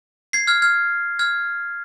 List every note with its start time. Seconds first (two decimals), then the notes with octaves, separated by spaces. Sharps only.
0.33 G#6 C7
0.47 F6 G#6
0.62 F6 G#6
1.19 F6 G#6